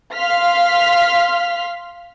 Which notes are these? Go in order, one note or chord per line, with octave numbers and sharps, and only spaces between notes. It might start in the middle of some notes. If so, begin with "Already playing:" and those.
F5 C6 F6 B6